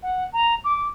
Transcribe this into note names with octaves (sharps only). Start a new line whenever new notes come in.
F#5
A#5
D6